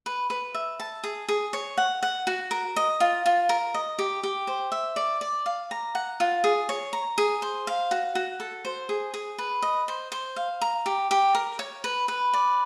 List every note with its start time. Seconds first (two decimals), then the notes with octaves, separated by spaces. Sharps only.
0.06 B4
0.30 B4
0.54 E5
0.80 A5
1.04 G#4
1.29 G#4
1.53 C#5
1.78 F#5
2.03 F#5
2.27 F#4
2.51 A#4
2.76 D#5
3.00 F4
3.26 F4
3.49 A#4
3.74 D#5
3.99 G4
4.23 G4
4.47 C5
4.72 E5
4.96 D5
5.21 D5
5.46 F5
5.71 A#5
5.95 F#5
6.20 F4
6.44 G#4
6.69 C#5
6.93 A#5
7.18 G#4
7.42 C5
7.67 F5
7.91 F#4
8.15 F#4
8.40 A4
8.65 C5
8.89 G#4
9.14 G#4
9.38 B4
9.62 D#5
9.88 C5
10.12 C5
10.36 F5
10.61 A#5
10.86 G4
11.11 G4
11.35 A#4
11.59 C#5
11.84 B4
12.08 B4
12.33 D5